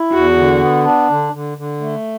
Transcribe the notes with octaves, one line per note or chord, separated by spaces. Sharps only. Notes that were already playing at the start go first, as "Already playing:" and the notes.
Already playing: E4
E2 F#4
D3
B3
D4
D3
D3
D3
A3